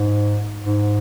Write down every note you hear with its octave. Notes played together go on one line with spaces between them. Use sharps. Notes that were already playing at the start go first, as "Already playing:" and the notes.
Already playing: G#2
G#2